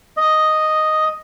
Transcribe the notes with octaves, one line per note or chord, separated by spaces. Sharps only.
D#5